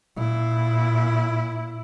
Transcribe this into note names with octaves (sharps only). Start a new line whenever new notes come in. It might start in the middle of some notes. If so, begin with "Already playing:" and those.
A#2 E4